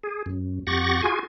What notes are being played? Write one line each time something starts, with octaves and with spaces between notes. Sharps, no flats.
G#4
F#2
F2 G4 F#5 C#6 A6 A#6
F4 F#4 G#4 G#5